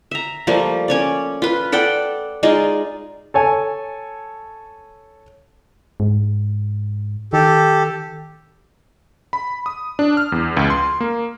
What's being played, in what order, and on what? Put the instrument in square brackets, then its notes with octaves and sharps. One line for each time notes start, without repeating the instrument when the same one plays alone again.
[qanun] E5 A#5
F3 G3 A3 A#3
C#4 C#5 D5
F4 B4
A4 D5 F#5 G5
G#3 D#4 F4 D5
[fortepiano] A4 C#5 G#5
[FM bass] G#2
[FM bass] D#3 [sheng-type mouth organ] G4 A4
[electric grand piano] B5
D#6
D4
F6
E2
C#2
C6
A#3